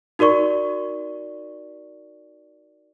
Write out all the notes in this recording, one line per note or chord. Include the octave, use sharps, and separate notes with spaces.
D#4 F#4 A#4 D5 C#6